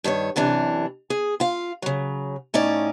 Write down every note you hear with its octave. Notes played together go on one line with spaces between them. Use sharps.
G2 D#3 B4 C#5
F#2 C3 E3 D4
G#4
F4 F5
C#3 F#3
A2 C#4 D#4 D5